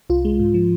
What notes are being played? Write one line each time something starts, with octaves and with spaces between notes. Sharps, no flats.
C2 F4
G#3
G#2
F3